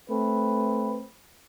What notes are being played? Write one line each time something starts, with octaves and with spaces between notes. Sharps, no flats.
A3 C4 B4